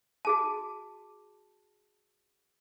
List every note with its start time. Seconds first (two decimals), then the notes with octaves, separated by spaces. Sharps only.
0.25 F#4 G#4 A5